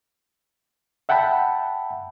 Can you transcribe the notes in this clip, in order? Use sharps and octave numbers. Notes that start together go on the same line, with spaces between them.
E5 F#5 G5 A5 B5